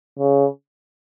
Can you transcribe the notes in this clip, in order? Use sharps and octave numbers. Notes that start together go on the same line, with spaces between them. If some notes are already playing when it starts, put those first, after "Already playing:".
C#3